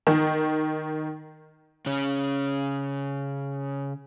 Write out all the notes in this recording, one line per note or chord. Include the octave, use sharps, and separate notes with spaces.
D#3
C#3 C#4